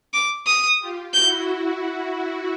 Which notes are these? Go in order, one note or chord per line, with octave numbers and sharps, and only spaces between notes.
D6
D#6
F4 G4
E4 F#4 G6